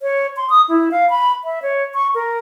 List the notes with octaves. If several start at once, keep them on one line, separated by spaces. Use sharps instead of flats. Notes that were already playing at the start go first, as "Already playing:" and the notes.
C#5
C6
D#6
E4
F5
B5
E5
C#5
C#6
A#4